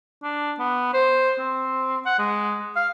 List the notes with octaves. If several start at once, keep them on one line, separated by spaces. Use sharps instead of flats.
D4
B3
C5
C4
F#5
G#3
F5